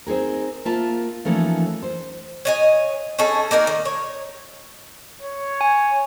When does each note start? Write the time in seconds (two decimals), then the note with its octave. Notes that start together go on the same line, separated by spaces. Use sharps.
0.06 C4 D#4 G#4 A#4
0.65 A#3 F4 E5 A5
1.25 E3 F3 A3 A#3 C#4 D#4
1.83 C5
2.45 C#5 D#5 G#5
3.19 C#4 D#4 G#4 A4
3.51 A#3 D#4 A#4 D5
3.67 D#3
3.85 C#5
5.22 C#5
5.61 G#5